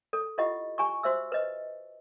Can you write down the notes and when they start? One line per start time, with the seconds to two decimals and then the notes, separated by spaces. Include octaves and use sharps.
0.13 A4
0.38 E4 F4 G4 D#5 F#5
0.78 G4 G#5 A#5 C#6
1.03 F#4 C5 E5 E6
1.32 B4 D#5